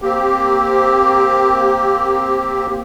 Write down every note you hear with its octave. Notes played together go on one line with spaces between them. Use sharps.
A#3 C4 G4